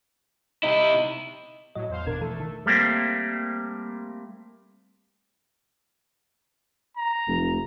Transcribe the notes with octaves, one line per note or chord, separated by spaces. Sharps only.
C3 D#4 E4
A2 F#3 D#5
E2 C5 F5
G#1 B2 D4 A#4 G#6
E3 A3 A4
D#3
G3 A3 A#3 C4
A#5
F1